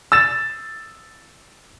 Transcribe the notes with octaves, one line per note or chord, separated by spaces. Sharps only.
E6 A6 E7